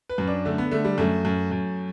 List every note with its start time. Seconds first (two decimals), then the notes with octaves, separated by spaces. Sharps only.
0.09 B4
0.18 F#2
0.27 D4
0.45 D3 A3
0.58 B3
0.71 D3 A3
0.84 G3
0.98 F#2 A3
1.25 F#2
1.51 F#2